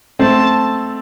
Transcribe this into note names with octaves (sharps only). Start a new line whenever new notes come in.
A3 C4 A5